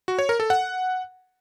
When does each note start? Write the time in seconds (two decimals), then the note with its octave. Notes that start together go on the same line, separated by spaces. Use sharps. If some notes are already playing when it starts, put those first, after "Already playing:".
0.08 F#4
0.19 C#5
0.29 A#4
0.40 A4
0.50 F#5